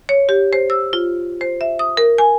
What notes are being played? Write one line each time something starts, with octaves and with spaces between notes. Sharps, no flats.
C#5
G4
C5
E6
F4
C5
E5
D#6
A#4
G#5